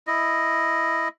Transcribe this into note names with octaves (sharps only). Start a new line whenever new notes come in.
E4 D#5